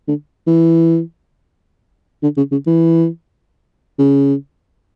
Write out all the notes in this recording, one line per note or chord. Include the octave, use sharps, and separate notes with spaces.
D3
E3
D3
C#3
C#3
E3
C#3